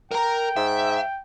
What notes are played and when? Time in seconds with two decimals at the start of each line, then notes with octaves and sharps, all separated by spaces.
0.11 A#4 G5 A#5
0.56 G#2 E5